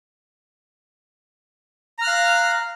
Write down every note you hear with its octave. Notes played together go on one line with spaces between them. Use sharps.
F5 A#5 F6 F#6